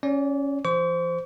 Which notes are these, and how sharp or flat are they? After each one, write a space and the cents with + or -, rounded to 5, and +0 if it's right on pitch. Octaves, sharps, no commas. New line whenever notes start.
C#4 +0 D5 -30
E3 +45 C5 -10 C#6 +45